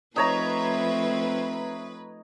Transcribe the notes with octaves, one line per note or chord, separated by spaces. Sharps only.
F3 A3 C4 D#4 B4 C#5 E5 A#5